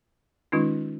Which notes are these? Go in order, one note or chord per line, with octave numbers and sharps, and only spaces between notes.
D#3 G#3 C#4 D#4 F4